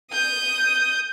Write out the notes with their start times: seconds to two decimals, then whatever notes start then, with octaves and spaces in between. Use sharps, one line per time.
0.11 D#6 G6